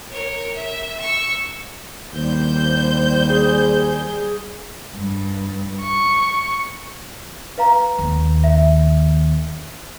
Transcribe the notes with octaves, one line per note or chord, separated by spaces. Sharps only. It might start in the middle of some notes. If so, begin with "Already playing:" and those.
A#4 C#5
E5
C#6 E6
D#2 G3 C5 G6
G#4
G2
C#6
B4 F5 A#5
D#2
E5